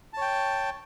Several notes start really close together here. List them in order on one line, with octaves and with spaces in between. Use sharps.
A5 C#5 G5